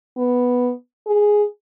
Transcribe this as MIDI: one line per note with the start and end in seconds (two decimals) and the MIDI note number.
0.17 0.71 59
1.07 1.43 68